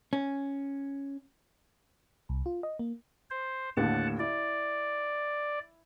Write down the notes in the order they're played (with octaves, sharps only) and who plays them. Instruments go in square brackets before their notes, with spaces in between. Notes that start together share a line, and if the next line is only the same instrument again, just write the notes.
[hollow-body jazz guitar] C#4
[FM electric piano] C2
F4
D#5
A#3
[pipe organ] C5
[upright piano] D#2 A2 D3 [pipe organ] F#5 A5
[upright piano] E4 [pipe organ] D5